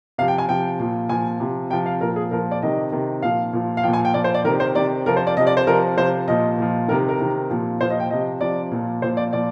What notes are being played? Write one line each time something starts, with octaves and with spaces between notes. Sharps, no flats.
C3 F3 F5
G5
G#5
C3 F3 G5
A#2 F3
A#2 F3 G#5
C3 F3
C3 F3 G5
F5
A#2 F3 A#4
G#4
A#2 F3 A#4
D5
C3 D#3 D#5
C3 D#3
A#2 F3 F5
A#2 F3
F5
A#2 F3 G5
G#5
G5
A#2 F3 D5
C5
D5
C3 D#3 A#4
C5
C3 D#3 D5
C3 F3 A#4
C5
D5
C3 F3 D#5
D5
C5
C3 F3 A#4
C3 F3 C5
A#2 F3 D#5
A#2 F3
C3 D#3 A#4
A#4
C3 D#3
A#2 F3
A#2 F3 C5
D#5
G5
C3 F3 D#5
C3 F3 D5
A#2 F3
A#2 F3 C5
D5
A#2 F3 D5